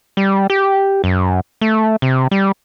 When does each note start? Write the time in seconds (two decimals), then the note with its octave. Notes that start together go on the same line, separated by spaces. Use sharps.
0.17 G3
0.50 G4
1.04 F#2
1.61 A3
2.02 C3
2.31 G3